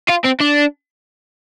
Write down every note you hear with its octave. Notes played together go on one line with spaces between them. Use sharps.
F4
C4
D4